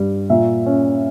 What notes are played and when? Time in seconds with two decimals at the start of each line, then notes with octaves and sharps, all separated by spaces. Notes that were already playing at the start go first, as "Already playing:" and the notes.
Already playing: G2 G3
0.29 A#2 E5
0.66 C#4